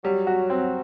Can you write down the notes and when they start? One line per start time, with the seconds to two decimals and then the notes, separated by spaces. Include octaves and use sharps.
0.04 F#3 G3
0.27 F#4
0.50 C4